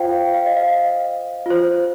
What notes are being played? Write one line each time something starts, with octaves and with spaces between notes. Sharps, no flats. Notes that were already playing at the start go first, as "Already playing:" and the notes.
Already playing: F4 C5 F5 G5
G5
F5
D#5
F5
F4 C5